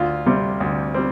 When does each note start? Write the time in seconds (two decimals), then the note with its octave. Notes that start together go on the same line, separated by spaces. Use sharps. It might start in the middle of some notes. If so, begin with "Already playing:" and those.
Already playing: D2 F4
0.26 C3 G3 C4
0.60 D2
0.94 G3 C4